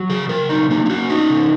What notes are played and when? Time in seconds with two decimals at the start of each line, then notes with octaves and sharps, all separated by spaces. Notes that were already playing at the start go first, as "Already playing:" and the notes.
Already playing: F#3
0.09 C#3 G#4
0.29 C#3 A#4
0.49 F#3 D#4
0.70 A#3 D#4
0.86 D#4
0.89 C#4 F#4
1.10 C#4 D#4
1.30 C#3